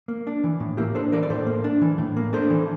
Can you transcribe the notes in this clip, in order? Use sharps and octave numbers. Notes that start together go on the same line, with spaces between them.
A#3
D4
E3
A2
A#3 E4 G4
D4 A4 C5
E3 A#4 D5
D5
A2 A4 C5
A#3
D4
E3
A2
A#3
D4 A4 C5
E3